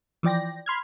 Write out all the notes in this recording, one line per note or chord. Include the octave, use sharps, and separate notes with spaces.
E3 F3 D5 G5 A#6
B5 C6 F6 G#6